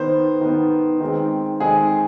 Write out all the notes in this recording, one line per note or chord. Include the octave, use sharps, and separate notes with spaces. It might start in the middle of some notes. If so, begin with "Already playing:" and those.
Already playing: D#3 B3 C5
D#3 B3
D#3 G#3 C4
D#3 G#3 C4 G#4